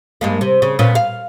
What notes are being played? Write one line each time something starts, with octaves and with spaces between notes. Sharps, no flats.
G2 G#3 A#3
C3
C#3
A#2 B3 C#4
F5